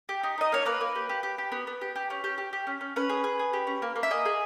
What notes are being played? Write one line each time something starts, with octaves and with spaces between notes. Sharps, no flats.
G4
D#4
D#4 D#5
A#3 C#5
A#3 B4
A#3
G4
G4
G4
G4
B3
B3
G4
G4
C#4
G4
G4
G4
C#4
C#4
C#4 B4
G#4
G#4
G#4
G4
C#4
A#3
A#3
E5
G#4 D#5
G#4